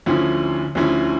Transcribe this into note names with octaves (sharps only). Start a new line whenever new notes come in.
D2 D3 F3 C#4 E4
D2 D3 F3 C#4 E4